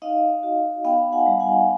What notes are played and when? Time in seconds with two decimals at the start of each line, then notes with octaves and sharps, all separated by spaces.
0.02 D#4 D#5 F5
0.43 F#4
0.84 B3 F5 G5
1.13 F#5 G#5
1.26 G3
1.40 F#5 G#5